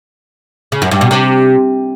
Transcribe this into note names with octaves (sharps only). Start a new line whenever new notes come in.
C#3
F#2
G2
B2
C3